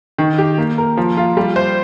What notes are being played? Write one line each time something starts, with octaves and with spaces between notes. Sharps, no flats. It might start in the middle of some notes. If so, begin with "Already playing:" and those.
D#3
G4
A#3
A#4
F3
F4
G3
C5